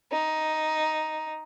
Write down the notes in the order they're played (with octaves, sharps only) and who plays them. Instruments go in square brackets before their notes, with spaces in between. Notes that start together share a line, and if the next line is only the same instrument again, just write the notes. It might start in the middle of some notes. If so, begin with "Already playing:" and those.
[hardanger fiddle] D#4